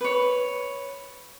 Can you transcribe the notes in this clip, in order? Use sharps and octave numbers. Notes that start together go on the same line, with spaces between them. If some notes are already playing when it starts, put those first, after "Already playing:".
B4 C#5